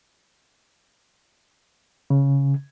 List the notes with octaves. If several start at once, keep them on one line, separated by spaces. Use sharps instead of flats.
C#3